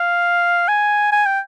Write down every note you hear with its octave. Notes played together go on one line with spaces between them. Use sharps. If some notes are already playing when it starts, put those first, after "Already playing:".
Already playing: F5
G#5
G#5
G5